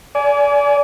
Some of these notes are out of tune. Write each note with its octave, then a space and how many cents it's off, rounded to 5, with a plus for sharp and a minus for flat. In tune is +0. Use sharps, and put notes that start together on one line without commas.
D5 -30 G#5 +15